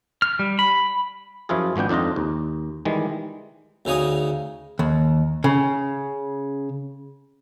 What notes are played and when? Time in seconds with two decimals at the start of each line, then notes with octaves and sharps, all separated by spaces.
0.22 F6
0.39 G3
0.59 B5
1.49 F#2 F3 E4 F4 G#4
1.76 G#1 F3 B3 D4 G5
1.89 F2 D4 D#4 F4 D#5
2.16 D#2
2.85 D#3 E3 G3 G#3
3.85 D2 C#3 D#4 G#5 D#6
4.79 D#2
5.44 C#3